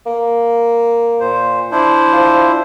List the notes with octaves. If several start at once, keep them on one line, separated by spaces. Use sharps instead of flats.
A#3
A#2 C5
D4 E4 C5
F3